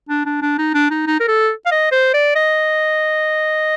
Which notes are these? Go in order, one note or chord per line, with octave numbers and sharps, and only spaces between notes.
D4
D4
D4
D#4
D4
D#4
D#4
A#4
A4
F5
D#5
C5
D5
D#5